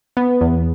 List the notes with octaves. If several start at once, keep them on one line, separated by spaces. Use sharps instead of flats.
B3
E2